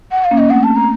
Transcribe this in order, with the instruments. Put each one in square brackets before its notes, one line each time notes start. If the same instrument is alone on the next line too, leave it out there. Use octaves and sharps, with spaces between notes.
[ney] F#5
F5
[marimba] A#3 C#4
[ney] D#5
[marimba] A3 C4 [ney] F#5
[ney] A5
A#5